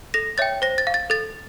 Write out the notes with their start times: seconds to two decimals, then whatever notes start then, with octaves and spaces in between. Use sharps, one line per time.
0.14 A4 A#6
0.38 C#5 E5 G5 A6
0.62 C5 A#6
0.78 A6
0.87 F5
0.94 A6
1.10 A4 A6